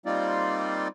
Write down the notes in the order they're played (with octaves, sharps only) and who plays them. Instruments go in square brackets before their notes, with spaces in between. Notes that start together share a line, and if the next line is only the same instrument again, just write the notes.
[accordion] G3 A#3 C4 D#4 F4 D5